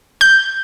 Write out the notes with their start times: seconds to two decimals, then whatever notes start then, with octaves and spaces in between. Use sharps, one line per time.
0.21 G6